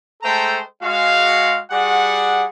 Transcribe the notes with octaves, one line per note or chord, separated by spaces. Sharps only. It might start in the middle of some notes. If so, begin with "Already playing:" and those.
G#3 A3 A4 C5 G5 A#5
G#3 F#4 F5
G3 F#4 G#4 D5 F#5